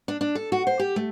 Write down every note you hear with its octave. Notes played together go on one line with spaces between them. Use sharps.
D4
D4
A4
F#4
C5
G4
A3